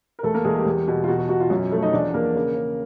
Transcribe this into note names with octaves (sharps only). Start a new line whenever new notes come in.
A#4
E2 A3 A4
A#3 A#4
E2 G#3 G#4
G3 G4
E2
B2
F4
B2 F#4
F#4
B2 F#4
F4
F#2
F3 A3 A4
D#4 D#5
E2 D4 D5
E2 A#3 A#4
C#3
C#3